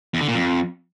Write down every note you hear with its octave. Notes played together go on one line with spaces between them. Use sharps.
E2
D3
A#2
F2